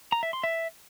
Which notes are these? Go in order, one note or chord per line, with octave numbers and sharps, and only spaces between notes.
A#5
E5
C6
E5